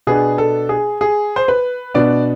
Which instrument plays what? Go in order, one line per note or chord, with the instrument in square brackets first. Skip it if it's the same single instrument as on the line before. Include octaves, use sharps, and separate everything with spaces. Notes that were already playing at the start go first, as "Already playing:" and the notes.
[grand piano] B2 B3 D4 G#4
A4
G#4
G#4
C5
B4
B2 B3 D4 D5